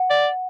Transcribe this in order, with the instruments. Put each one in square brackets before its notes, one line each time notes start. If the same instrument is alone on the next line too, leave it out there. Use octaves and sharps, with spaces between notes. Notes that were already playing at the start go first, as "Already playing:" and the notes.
Already playing: [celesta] F#5
[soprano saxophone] D5